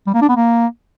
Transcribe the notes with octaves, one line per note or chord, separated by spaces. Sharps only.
G3
A#3
D4
B3
A#3